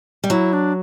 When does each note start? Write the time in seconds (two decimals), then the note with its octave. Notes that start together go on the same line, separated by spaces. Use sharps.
0.24 G3
0.30 F#3 E4
0.53 D4